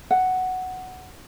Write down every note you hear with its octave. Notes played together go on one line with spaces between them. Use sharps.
F#5